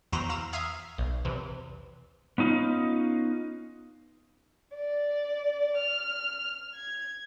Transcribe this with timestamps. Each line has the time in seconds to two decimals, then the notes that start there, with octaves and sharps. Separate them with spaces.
0.12 E2 F#4 C5 A#5 B6 D7
0.29 F5 A#5 E6
0.53 E5 F5 D#6 F6 G#6
0.98 B1
1.25 E2 C3
2.38 B3 C#4 D#4 F4
4.76 D5
5.76 F6
6.74 G#6